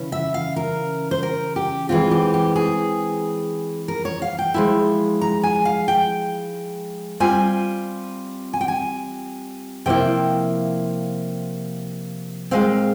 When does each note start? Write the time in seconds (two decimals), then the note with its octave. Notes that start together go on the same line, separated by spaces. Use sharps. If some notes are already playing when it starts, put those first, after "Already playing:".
Already playing: C#3 E3 C#4
0.12 E5
0.34 F5
0.56 A#4
1.11 C5
1.23 A#4
1.56 G4
1.89 E3 G#3 C4 F4
2.11 G4
2.34 G4
2.56 G#4
3.88 A#4
4.05 C#5
4.22 F5
4.39 G5
4.54 F3 G#3 E4
5.21 A#5
5.43 G#5
5.65 F5
5.88 G5
7.20 G3 C4 F4 G#5
8.53 G#5
8.61 G5
8.68 G#5
9.86 C3 F3 A#3 E4 G5
12.51 A#2 G#3 C4 F5